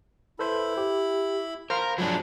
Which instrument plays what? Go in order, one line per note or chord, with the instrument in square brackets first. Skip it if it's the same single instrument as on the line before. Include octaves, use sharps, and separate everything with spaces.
[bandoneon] E4 B5 [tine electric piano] A4 B4 C5
[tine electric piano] G4
[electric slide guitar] A#4 [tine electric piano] C5 F5 B5
[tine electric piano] F3 [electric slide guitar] F#3 G#3 D4 [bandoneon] B5